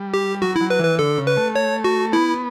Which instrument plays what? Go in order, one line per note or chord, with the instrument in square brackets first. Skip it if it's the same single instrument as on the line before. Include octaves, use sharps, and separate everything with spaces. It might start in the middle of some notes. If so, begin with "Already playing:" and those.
Already playing: [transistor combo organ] G3
[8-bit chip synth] G4
[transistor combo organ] F#3 [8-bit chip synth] F#4
[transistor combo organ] F#3 [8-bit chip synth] E4
[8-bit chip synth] B4
[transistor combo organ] E3
[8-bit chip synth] B4
[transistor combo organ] D3 [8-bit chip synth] A4
[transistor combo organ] C#3
[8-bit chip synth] B4
[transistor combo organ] A3
[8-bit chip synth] C#5
F#4
[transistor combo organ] B3 [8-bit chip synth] E4